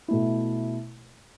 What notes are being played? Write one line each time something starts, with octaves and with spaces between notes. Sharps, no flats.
B2 A3 E4